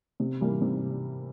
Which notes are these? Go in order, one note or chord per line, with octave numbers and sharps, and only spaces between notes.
C3
E3 G3 A#3
C3